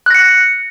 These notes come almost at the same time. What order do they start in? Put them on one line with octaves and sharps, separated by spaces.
F#6 A#6 C#7